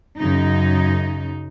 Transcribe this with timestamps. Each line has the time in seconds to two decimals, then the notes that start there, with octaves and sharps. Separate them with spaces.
0.19 F#2 C#3 D#4